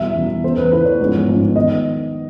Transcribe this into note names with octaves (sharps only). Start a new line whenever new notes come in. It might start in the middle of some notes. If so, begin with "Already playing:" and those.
Already playing: E2 B2 G3 E5
E2 B2 G3
E2 C#3 E3 C5
B4
E2 C#3 E3 B4
C#5
A1 G#2 F3 G#3 B3
A1 G#2 F3 G#3 B3
D#3 B3 D#5